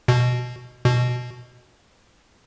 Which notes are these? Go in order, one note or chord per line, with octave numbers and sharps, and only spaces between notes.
B2
B2